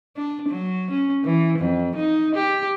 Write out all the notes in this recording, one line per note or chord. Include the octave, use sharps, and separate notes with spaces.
D4
F#3
C#4
E3
F2
D#4
G4